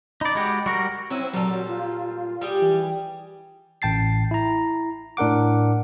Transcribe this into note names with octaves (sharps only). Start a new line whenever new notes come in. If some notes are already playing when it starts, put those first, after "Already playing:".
D#4 D5 B5
G#3 F#4 G4
G3 F#4 A#4 C#6 A#6
F#3 C4 C#4 E4
A#2 F#3 G3 A4
F4
G3 G4 G#4
E3
A1 G5 A5 A6 C7
E4 A#5
A2 D4 A#4 F#5 D6